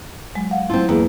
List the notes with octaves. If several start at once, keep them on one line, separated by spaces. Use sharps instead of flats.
F#3 G#3
F5 F#5
F#3 A3 C4 E4 F4
E2 A#3 E4 G#4